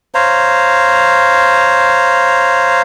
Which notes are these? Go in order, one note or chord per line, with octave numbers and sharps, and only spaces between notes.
C5 C#5 F5 A#5